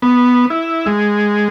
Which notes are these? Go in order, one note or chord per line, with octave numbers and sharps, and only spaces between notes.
B3
E4
G#3